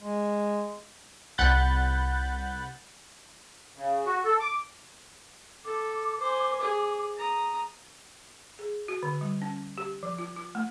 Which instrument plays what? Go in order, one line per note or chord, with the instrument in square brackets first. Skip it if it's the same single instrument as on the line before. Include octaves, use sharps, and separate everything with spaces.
[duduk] G#3
[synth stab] C2 F#5 B5 F#6 G6 A6
[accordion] C#3
F#4
A4
D6
[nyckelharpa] A4 [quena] D6
[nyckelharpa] C5 G#5
G#4
A#5 D#6
[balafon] G#4
F#4
D3
G3
C#4
G4
F3
F4
F4
A3